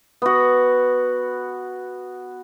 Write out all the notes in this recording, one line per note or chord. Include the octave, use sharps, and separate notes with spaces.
B3 F#4